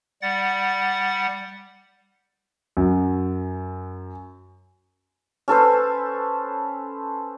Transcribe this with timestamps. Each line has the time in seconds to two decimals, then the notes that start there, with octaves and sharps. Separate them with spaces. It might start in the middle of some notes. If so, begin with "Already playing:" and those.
0.22 G3 F#5 A6
2.77 F#2
5.48 C#4 A4 B4 C5